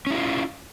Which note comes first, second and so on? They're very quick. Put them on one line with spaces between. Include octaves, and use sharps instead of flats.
C#4 E4 F4